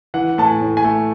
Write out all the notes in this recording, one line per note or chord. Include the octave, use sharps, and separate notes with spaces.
E3 F#5
A2 A5
G#5
A2
G#5
A3